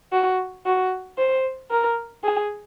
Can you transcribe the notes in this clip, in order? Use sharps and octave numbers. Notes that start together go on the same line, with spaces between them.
F#4
F#4
C5
A#4
G#4